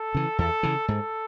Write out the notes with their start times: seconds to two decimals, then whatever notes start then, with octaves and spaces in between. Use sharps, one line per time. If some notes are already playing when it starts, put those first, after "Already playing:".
Already playing: A4
0.15 C#3 E3
0.38 E2 A4
0.63 C#3 E3
0.87 G#2 A4